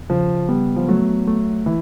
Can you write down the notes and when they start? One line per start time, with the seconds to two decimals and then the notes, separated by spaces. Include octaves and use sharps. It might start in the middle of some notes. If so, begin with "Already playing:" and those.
Already playing: E2
0.10 C#3 F3
0.49 G3 B3
0.76 F3
0.88 F#3 A3
1.28 A3
1.66 E3